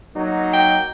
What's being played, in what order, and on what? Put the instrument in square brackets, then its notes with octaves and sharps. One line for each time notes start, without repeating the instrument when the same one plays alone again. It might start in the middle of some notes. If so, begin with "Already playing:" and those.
[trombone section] F#3 A#3 D#4
[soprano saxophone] G5